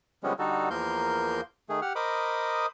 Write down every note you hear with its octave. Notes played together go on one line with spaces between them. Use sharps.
D3 F3 G3 G#3 B3 C#4
D3 G3 D#4 F#4 A4
E2 F3 A#3 A#4 C6 G6
D#3 A3 G#4
G4 F#5 F6
A#4 C5 D#5 B5 D6 D#6